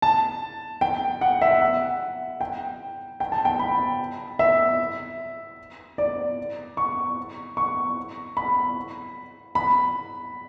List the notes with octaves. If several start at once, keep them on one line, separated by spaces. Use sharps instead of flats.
A5
G5
F#5
E5
F#5
G5
G5
A5
G5
B5
E5
D5
C#6
C#6
B5
B5